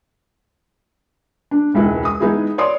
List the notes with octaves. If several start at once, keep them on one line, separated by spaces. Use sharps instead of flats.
D4
E1 C#2 E4 B4
D#6
G#3 B3 D#4 E4 G#4
C#5 D5 C6 D#6